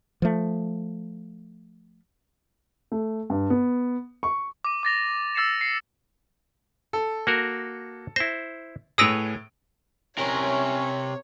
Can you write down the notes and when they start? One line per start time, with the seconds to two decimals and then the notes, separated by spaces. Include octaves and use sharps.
0.22 F3 A3
2.92 A3
3.30 G2
3.50 B3
4.23 C#6
4.65 D6 D#7
4.83 D6 A6 A#6 F7
5.35 D6 E6 A6 C7 C#7 E7
5.61 C7 C#7
6.93 A4
7.27 A#3 F#4 A#4
8.16 E4 C5 A#6
8.98 A2 G#4 B4 C#5 D#6 E6 A#6 D7
10.18 C3 C#4 A#4 C#5